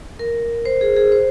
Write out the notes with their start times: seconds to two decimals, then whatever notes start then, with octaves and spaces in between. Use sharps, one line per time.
0.19 A#4
0.65 C5
0.81 G#4
0.96 G#4
1.12 C5